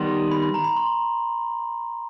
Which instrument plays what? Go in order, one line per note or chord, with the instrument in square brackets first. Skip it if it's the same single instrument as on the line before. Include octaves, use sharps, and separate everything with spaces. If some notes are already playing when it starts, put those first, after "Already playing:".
Already playing: [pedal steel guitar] D#3 G3 B3 D#4 [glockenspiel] C6
[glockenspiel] B5
B5
A#5
B5
C6